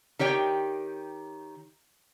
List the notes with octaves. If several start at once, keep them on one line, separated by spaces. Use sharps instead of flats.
D#3 G4 C#5 G5